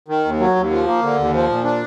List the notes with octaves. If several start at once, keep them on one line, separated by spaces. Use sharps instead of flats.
D#3
D#2
F#3
D#2
F3
A#3
D3
D#2
F3
A#2
D4